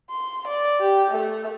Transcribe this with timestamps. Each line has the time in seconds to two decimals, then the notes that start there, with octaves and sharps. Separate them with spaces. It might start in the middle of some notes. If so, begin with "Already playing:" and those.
0.11 C6
0.48 D5
0.80 G4
1.11 A3